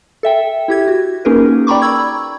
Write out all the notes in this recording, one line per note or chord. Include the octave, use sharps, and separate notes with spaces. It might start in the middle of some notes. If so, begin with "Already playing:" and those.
A4 E5 G5
E4 G4 G#6
F#4
A#3 C#4 D#4 G#4 A#4 B4
D5 G5 A#5 B5 C#6 D6
B5 C#6 E6 G#6